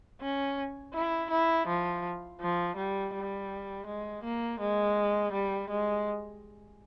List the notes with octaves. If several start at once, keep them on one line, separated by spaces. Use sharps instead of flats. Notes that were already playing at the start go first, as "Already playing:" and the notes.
C#4
E4
E4
F3
F3
G3
G3
G#3
A#3
G#3
G3
G#3